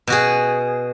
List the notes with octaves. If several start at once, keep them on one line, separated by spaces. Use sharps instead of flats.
B2 F#4 G#4